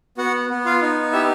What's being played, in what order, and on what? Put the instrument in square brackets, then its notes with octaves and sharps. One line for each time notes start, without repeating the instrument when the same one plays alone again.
[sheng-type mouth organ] B3 F#4 F#5
B3
F4 F5
D#4
E4 G4 E5